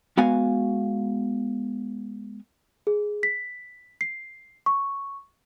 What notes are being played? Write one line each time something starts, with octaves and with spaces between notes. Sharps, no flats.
G#3 B3 F#4 F5 G#5
G#4
B6
C7
C#6